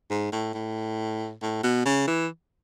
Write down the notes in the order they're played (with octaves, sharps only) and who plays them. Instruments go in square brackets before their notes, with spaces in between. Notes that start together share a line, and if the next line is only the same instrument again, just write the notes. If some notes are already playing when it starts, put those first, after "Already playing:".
[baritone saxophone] G#2
A2
A2
A2
B2
C#3
E3